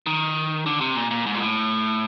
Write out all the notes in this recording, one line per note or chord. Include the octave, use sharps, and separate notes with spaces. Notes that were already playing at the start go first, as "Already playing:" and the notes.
D#3
D3
C3
A#2
A#2
G#2
A#2
A2